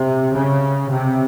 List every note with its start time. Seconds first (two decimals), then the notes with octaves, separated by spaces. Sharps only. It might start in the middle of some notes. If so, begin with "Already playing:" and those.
Already playing: C3
0.34 C#3
0.92 C3